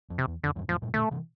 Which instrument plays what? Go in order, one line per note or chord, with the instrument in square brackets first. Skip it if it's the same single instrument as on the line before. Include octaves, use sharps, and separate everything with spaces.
[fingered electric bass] F2
[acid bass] C3
[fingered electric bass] E2
[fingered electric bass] F2 [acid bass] D3
[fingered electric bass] E2 G2
[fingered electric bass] F2 A2 [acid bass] F3
[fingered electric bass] G2 A#2
[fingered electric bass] A#2 D3 [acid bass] A3
[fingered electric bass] C3 E3